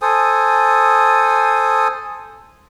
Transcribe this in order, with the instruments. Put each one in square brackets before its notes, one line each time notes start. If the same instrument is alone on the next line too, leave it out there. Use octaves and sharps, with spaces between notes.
[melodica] A4 C5 G#5 D#6